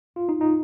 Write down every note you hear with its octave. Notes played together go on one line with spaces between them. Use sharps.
F4
D#4
D#4